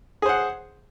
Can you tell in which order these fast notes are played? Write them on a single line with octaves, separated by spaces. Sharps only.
G#4 C5 F#5